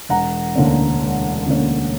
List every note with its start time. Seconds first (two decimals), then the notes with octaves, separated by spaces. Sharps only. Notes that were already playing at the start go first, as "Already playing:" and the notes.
0.09 E1 F#5 A#5
0.55 D2 D3 A#3 C#4
1.00 E1
1.46 D2 D3 A#3 C#4